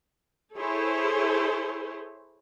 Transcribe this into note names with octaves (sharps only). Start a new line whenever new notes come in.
E4 G#4 A4 C5 C#5